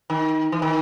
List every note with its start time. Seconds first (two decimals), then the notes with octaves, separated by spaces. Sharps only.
0.10 D#3
0.52 E3
0.62 D#3